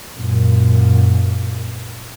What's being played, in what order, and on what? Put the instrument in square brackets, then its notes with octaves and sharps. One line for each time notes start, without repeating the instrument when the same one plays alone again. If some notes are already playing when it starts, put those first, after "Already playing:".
[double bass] F#2 A#2